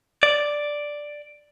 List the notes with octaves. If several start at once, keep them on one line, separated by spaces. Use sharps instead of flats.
D5